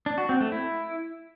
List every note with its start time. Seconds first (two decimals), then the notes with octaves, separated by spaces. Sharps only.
0.06 D4
0.18 F#4
0.29 C4
0.41 A3
0.52 E4